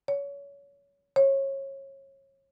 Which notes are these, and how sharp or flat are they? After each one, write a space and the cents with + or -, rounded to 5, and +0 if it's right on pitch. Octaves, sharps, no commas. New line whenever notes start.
C#5 +25
C#5 -25